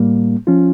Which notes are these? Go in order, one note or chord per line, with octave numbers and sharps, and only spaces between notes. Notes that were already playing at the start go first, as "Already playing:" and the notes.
Already playing: A2 G3 A#3
F3 C#4 F4